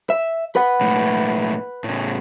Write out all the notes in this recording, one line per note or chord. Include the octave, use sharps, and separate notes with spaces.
E5
B4 F#5
B1 A2
A2 C#3